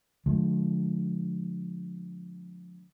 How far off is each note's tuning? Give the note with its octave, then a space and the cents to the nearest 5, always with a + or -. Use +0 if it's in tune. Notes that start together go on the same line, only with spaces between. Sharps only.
D3 +0 F3 +30 G#3 +40